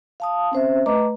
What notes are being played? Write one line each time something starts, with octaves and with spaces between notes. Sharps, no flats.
F5 A5 D#6
C4 C#4 C5 E5
A3 B4 D#5 A#5 D6